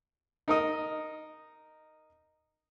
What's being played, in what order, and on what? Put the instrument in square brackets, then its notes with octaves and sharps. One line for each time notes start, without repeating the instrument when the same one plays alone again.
[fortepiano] D#4 A#4 D#5